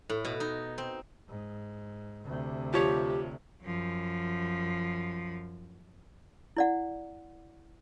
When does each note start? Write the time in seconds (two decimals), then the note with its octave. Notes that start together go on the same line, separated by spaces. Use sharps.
0.09 A2
0.25 B2
0.40 D#4
0.78 C4
1.29 G#2
2.26 D2 C3
2.73 F3 G4 C#5
3.63 F#2 F3
6.57 E4 D5 F#5